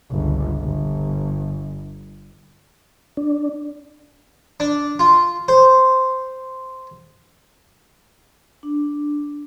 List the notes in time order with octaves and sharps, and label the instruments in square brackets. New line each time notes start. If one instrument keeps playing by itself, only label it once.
[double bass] G1 C#2
G1
[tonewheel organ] D4
[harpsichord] D4
F4
C5
[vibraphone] D4